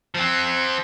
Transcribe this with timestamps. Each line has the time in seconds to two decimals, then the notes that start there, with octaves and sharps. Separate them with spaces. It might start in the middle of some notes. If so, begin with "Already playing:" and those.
0.15 F3 C4